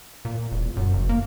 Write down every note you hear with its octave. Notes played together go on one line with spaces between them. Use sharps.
A#2
E1
F#2
F#1
A#3